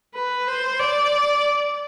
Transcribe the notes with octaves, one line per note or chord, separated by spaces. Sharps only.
B4
C5
D5